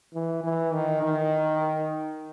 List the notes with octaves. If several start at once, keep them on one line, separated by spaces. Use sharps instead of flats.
E3
E3
D#3
D#3